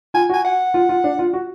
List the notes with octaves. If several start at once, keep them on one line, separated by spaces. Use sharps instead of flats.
F4 G#5
F#4 G#5
F#5
F4
F4
D4
F4
F#4